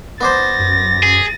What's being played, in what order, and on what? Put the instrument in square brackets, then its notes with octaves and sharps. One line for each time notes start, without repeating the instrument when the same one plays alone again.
[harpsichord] B3 D4 C5 [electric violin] A6 A#6
[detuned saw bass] F#2
[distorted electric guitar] G#4